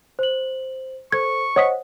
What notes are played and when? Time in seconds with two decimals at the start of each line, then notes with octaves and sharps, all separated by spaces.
0.19 C5 F#7
1.12 A4 C5 C#6 G#6
1.56 C5 C#5 D#5 F#5 D#6 B6